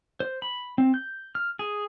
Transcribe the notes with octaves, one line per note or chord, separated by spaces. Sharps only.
C5
B5
C4
G6
F6
G#4